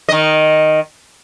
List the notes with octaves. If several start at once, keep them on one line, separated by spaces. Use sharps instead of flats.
D#3 D#5